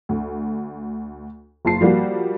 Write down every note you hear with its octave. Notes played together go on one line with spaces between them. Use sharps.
D2
F#1 F4 A5 C7
F3 G3 A#3 F#4